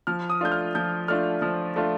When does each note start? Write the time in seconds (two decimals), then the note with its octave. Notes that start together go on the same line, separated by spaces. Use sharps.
0.07 F3 F6
0.30 D#6
0.41 A3 D4 F4 G6
0.52 F6
0.75 F3 G6
1.08 A3 D4 F4 F6
1.42 F3
1.76 A3 D4 F4